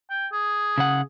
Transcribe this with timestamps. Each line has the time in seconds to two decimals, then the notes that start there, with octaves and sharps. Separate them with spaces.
0.10 G5
0.32 G#4
0.78 C#3 F#5